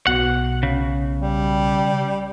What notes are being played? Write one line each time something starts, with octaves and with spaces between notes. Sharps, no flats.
B1 B2 F#5
C#3
G3